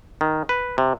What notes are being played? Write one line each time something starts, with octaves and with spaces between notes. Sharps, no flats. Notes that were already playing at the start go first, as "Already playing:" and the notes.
D#3
B4
C3